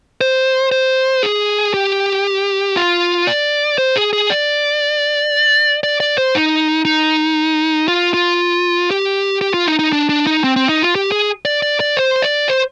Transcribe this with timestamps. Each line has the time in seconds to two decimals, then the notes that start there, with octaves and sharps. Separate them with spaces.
0.21 C5
0.72 C5
1.23 G#4
1.74 G4
2.77 F4
3.27 D5
3.78 C5
3.96 G#4
4.13 G#4
4.30 D5
5.83 D5
6.00 D5
6.18 C5
6.35 D#4
6.85 D#4
7.88 F4
8.14 F4
8.91 G4
9.41 G4
9.54 F4
9.67 D#4
9.79 D#4
9.93 D4
10.09 D4
10.27 D#4
10.44 C4
10.56 C4
10.69 D#4
10.83 F4
10.95 G4
11.12 G#4
11.45 D5
11.62 D5
11.80 D5
11.97 C5
12.22 D5
12.49 C5